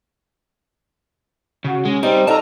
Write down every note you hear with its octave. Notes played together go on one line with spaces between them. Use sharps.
C#3 F#4
G#3 C#4
G3 C4 D#4
D4 D#4 F4 A4 A5 A#5